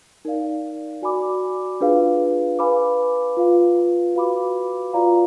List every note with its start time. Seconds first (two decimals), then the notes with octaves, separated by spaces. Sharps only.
0.25 D#4 A#4 D5 F5
1.02 F#4 D5 G#5 B5 D6
1.81 D4 F4 G#4 B4 F5
2.59 B4 F5 G#5 B5 D6
3.37 F4 B4 F5
4.15 F#4 B4 F5 B5 D6
4.93 F4 B4 D5 F5 A#5